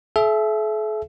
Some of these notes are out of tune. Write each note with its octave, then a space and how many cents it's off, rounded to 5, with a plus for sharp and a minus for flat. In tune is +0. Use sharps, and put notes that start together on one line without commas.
A4 -45 E5 +15